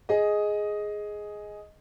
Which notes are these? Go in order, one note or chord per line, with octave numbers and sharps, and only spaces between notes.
G#4 D#5